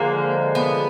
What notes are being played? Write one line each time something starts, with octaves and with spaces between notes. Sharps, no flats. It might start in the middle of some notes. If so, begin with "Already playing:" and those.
Already playing: D3 F3 G#3 A#3
B3